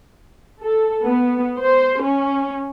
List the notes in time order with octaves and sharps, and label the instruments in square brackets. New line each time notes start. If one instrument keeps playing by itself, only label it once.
[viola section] A4
B3
C5
C#4